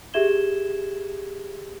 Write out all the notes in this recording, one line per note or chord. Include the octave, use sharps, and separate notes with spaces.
G4 G#4 E5 G#6 E7 G7